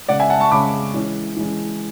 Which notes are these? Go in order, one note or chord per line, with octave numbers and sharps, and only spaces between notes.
C#3 G#3 C#4 D5 F#5
E5 G#5
F#5 A5
A5 C#6
C#3 G#3 C#4 B5 D6
E3 G#3 C#4
E3 G#3 C#4